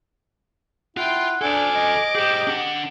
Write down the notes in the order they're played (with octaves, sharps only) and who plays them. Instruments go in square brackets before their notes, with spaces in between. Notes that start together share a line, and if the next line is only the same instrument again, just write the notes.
[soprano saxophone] E4 [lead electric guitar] F4 [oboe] F#5 [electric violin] G5 C6
[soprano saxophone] D4 [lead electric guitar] A4 C5 [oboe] G#5 [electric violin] D6
[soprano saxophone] D#5
[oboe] G4 [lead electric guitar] G#4 C5
[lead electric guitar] D4 F#5